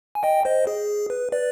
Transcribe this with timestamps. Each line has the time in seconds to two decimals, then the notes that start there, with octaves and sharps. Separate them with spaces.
0.15 G#5
0.23 D#5 G5
0.45 C5 D#5
0.67 G#4
1.10 B4
1.32 B4 D5